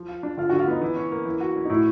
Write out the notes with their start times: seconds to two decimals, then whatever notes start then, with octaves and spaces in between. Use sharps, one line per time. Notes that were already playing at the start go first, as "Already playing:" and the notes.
Already playing: F3
0.08 F4
0.23 D4
0.37 D3 F4
0.49 D3 F#4
0.59 F4
0.68 B3 D#4
0.81 E3
0.96 C#4
1.12 A#3
1.25 E3
1.40 F#4
1.56 C#4
1.65 D#4
1.69 A2 E4